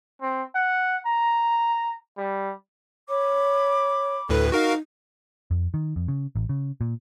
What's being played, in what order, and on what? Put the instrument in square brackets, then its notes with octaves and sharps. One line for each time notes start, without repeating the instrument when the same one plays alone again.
[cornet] C4
F#5
A#5
G3
[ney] C#5 [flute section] B5 D6
[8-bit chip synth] D2 A2 B4 [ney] A4
[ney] D#4 [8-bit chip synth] F#4 A#4 F5
[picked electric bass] F2
D#3
F2
C#3
A1
C#3
A#2